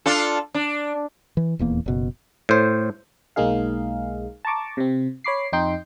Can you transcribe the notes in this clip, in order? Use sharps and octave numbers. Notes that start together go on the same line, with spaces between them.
D4 F4 A4
D4
E3
D#1 E2 A#3
F#1 B2
A2 C5
B1 G#3 A#3 D#4 G#4 F5
A5 A#5 C#6 D6
C3 C4
C#5 B5 D6 C7
F2 D#4 G5 C6